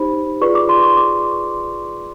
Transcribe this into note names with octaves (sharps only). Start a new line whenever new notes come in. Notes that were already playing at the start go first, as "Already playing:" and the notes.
Already playing: D#4 G4 C5 B5
F4 G#4 B4 D5 C#6
D6
C6
C#6
D6